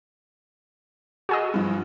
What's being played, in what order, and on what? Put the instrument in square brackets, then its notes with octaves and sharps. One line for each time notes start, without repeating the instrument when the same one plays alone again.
[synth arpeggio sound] F#4 G#4 D#5
[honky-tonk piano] G2 F3